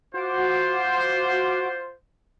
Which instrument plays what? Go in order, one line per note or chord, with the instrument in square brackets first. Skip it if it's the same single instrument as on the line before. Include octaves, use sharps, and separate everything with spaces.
[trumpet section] F4 C5 [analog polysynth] F#4 F#5 D6